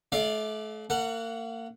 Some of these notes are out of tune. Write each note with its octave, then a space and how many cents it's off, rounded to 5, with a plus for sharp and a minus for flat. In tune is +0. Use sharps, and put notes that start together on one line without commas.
A3 -35 D5 +5 F5 +5
A#3 -35 F#5 +0